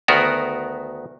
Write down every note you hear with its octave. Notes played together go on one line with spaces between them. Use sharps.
D2 D#3 B3 F#4 A#4